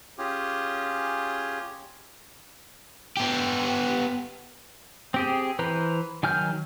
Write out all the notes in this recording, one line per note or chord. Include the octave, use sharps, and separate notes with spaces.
C#4 F4 G4 G#4
B3 G4
C4 G4 G#4
E3 B4 C5 A#5
D#3 F#3 G#5 F6 G6